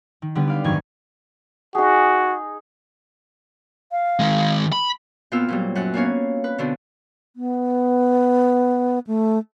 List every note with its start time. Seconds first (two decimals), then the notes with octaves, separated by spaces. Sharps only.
0.22 D#3
0.35 D3 G3 B3 G4 B4
0.47 D5 F5 G5
0.64 G#1 F#2 D#3 G#5 C#6 G#6
1.75 D#4 F#4 G#4
3.92 F5
4.19 D#3 G#3
4.72 B5
5.32 A#2 B3 C4 F4 E6 F6
5.49 A#2 F#3 G3
5.75 F#2 F#5 F#6
5.94 A#3 B3 C#4 D4 C#5 F5
6.44 B4
6.58 B2 D3 C4
7.36 B3
9.07 A3